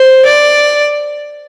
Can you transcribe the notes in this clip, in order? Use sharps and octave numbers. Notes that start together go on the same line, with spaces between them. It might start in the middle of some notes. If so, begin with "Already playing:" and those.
Already playing: C5
D5